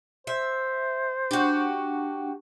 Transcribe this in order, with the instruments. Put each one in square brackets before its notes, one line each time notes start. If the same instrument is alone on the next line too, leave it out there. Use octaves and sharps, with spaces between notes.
[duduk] C5 [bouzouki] E5
[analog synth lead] D4 [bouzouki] F#4 G4